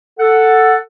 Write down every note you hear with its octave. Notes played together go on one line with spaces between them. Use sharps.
A4 F#5